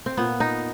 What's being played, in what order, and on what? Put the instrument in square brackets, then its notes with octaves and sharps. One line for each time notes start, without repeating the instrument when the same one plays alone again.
[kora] C4
A#2 B3
D#4